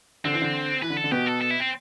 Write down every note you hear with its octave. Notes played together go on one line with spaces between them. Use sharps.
D3 C4
E3
D3
E3 B4
D3
A4
D3
B2 B3 G4
A4
A4
E4
C4